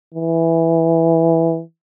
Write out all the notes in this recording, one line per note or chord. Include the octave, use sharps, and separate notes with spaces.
E3